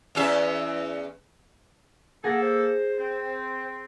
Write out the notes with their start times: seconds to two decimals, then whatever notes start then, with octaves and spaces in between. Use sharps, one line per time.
0.15 E2 C#4 E5
2.24 A#3 G#4 A4 F#5 A#6
2.41 C5
2.98 C4